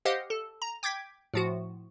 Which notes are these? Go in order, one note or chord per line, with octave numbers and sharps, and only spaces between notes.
G4 C5 D#5 F5 F#5
A4
A#5
G5 D6 G6 G#6 B6
A2 F3 F#4